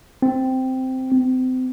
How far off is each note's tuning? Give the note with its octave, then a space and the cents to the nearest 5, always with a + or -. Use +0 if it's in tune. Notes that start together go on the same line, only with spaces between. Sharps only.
C4 -10
C4 -35